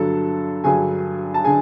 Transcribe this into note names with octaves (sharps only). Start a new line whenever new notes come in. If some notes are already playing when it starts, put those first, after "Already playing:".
Already playing: G2 D3 F#3 A4 A5
G2 D3 F#3 G#4 G#5
A5
D3 G#4 G#5